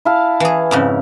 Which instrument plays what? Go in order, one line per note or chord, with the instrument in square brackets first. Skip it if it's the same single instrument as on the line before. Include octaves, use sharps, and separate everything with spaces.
[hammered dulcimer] E4 F5 A5
[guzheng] E3 G#4
F2 G#2 C#3